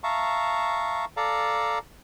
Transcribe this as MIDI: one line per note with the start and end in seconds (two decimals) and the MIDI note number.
0.04 1.05 76
0.04 1.05 77
0.04 1.05 81
0.04 1.05 82
0.04 1.05 85
1.17 1.79 69
1.17 1.79 74
1.17 1.79 77
1.17 1.79 81
1.17 1.79 82